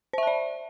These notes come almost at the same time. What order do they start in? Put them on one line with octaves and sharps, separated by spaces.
C5 E5 A5 D5